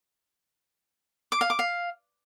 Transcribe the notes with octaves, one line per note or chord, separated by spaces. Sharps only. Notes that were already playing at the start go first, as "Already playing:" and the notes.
D6
F5
D6
F5